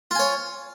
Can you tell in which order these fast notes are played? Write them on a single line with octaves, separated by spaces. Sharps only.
F4 G#5 C#5